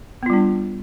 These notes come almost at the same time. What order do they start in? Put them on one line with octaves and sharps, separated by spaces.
B3 F4 G3 D4